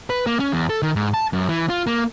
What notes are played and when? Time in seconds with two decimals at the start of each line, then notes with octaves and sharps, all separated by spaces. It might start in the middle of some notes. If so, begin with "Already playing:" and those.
0.10 B4
0.26 A#3
0.40 C#4
0.53 E2
0.69 A4
0.82 D#3
0.96 G#2
1.14 A5
1.33 F#2
1.49 E3
1.70 F4
1.87 A#3